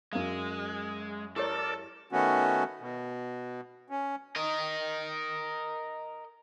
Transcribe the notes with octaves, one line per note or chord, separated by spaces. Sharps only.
F#2 G#3 F5
E4 G4 A4 A#4 C#5 D5
D#3 A3 B3 C#4 F#4
B2
C#4
A#4 D#5